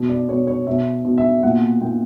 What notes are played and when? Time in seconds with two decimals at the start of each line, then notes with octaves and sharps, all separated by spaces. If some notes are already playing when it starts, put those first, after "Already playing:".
Already playing: B2
0.09 D5
0.28 B2 C#5
0.47 C#5
0.67 B2 E5
1.05 B2
1.18 E5
1.43 A#2 F#5
1.81 A#2 G5